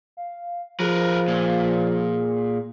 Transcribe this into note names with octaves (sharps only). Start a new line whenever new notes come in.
F5
F3 G#4 A#4 B4
A#2